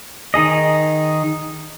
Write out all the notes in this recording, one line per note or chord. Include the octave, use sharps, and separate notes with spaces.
D#3 D#4 G#4 D#5